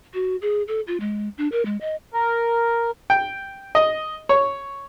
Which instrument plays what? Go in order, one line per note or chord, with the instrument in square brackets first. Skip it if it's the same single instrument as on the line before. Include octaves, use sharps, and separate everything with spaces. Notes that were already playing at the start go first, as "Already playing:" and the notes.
[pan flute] F#4
G#4
A4
F4
G#3
D4
A#4
G#3
D#5
[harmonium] A#4
[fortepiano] G5
D#5
C#5